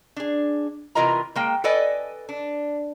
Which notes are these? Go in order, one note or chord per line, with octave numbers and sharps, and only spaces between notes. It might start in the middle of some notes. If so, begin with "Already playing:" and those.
D4 G#4
C3 E3 F4 A#4 D#5 A#5
G#3 A#3 G5
A4 B4 D5 D#5 G#5
D4